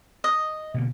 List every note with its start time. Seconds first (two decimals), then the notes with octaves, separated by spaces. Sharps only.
0.24 D#5
0.74 B2 D3 A#3